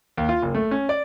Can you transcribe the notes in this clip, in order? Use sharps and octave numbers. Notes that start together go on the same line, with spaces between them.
D#2
F4
F#1
A3
C#4
D5